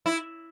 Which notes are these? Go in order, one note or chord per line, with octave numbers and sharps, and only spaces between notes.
E4